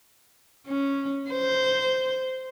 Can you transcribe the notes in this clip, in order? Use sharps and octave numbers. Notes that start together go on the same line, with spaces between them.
C#4
C5